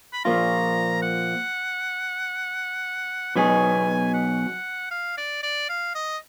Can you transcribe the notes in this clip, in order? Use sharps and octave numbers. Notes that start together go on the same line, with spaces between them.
B5
A#2 F3 A#3 F4 A#5
F#5
B2 F#3 B3 D#4 G#4 G#5
F#5
F5
D5
D5
F5
D#5